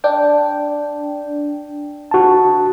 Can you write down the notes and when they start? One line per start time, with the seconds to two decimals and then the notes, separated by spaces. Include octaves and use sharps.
0.04 D4 G5
2.11 F#4 A5